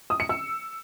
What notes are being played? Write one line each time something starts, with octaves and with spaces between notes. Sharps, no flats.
D#6
C#7
E6